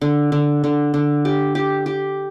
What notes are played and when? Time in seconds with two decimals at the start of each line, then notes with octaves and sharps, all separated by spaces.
0.01 D3
0.32 D3
0.64 D3
0.94 D3
1.25 G4
1.55 G4
1.86 G4